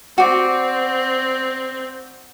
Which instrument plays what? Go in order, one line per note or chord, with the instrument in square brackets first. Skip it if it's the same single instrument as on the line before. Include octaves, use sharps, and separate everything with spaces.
[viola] C4 [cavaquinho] F#4 D5